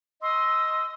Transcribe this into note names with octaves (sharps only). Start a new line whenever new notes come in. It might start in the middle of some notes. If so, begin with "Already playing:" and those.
D#5 C6 D#6 E6